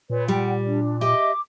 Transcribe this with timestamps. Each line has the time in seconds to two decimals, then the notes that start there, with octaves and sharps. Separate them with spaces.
0.10 A#2 B4 C#5
0.28 G3 F#5 G5
0.65 D4
1.01 G4 D#5 E5 D6